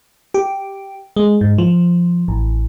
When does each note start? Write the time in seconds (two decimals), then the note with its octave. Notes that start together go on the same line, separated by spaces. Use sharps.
0.34 G4
1.16 G#3
1.41 G#2
1.58 F3
2.28 A1